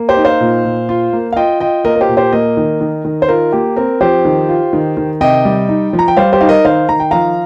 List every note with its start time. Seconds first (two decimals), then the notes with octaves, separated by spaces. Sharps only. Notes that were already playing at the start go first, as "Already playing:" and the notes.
Already playing: A#3
0.09 G4 C5
0.17 D#4
0.25 C5 F5
0.40 A#2
0.65 A#2
0.89 F4
1.13 A#3
1.33 F5
1.36 F4 D#5 G5
1.60 F4 D#5 G5
1.85 A#3 A#4 D#5
1.96 A#4
2.01 G4 C5
2.09 A#2
2.17 G4 C5
2.33 A#3 A#4 D#5
2.57 D#3
2.81 D#3
3.05 D#3
3.22 C5
3.29 F4 A#4
3.52 A#3 G4
3.76 C4 A#4
4.00 F3 G4 C5
4.25 D#3
4.49 F4
4.73 D#3
4.97 D#3
5.21 C3 D#5 G5
5.45 G3
5.69 D#4
5.93 F3
5.99 A#5
6.08 G5
6.17 G3 C5 F5
6.33 G4 C5
6.41 D#4 F5
6.49 A#4 D#5
6.65 D#3 C5 F5
6.89 D#3 A#5
7.00 G5
7.11 F3 F5 A#5